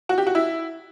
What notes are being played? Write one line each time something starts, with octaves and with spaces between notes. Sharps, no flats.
F#4
G4
F#4
E4